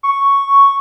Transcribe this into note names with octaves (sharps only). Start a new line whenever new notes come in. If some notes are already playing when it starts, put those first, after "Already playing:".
C#6